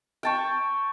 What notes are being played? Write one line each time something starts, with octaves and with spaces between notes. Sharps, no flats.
G5 A5 C#6